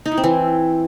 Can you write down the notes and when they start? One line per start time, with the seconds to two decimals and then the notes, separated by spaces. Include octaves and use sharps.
0.05 D#4
0.11 E4
0.18 C4
0.24 E3